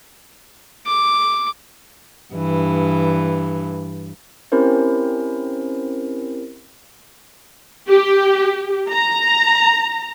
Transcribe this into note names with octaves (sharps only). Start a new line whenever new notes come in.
D6
G2 E3
C4 C#4 E4 G4 A#4 C5
G4
A#5